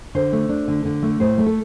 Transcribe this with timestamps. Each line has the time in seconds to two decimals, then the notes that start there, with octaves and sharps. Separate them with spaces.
0.15 D3 C5
0.32 A3
0.49 D4
0.68 D3
0.85 D3
1.03 A3
1.20 A2 C5
1.38 A3
1.46 A4